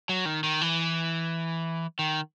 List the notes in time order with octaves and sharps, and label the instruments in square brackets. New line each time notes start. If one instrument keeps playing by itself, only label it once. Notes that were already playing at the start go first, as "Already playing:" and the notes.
[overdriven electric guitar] F#3
D#3
D#3
E3
D#3